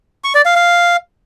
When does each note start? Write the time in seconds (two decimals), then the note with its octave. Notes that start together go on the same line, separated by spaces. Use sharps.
0.24 C#6
0.35 D5
0.45 F5
0.56 F5